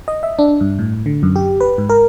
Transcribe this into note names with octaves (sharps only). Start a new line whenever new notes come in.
D#5
E5
D4
G2
A2
D3
F#2
G4
B4
G#2
A#4